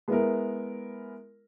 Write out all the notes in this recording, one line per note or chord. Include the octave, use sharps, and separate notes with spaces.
G#3 B3 E4 A#4